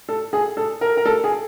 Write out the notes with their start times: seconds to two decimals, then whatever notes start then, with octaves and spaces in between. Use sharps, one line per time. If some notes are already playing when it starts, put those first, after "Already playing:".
0.09 A4
0.33 G#4
0.57 A4
0.81 A#4
0.97 A#4
1.06 A4
1.24 G#4